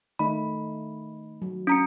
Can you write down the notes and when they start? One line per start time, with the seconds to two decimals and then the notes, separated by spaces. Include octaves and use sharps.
0.19 D#3 A3 D#4 B5
1.42 F#3
1.67 C#4 A#5 C#7